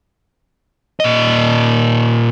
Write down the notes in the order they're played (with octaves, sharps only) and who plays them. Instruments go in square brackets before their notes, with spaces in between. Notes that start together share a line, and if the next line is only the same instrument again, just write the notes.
[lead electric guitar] A#2 D#5